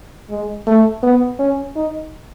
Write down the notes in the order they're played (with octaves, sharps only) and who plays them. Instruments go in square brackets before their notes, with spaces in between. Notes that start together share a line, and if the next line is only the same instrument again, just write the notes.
[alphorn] G#3
A3
B3
C#4
D#4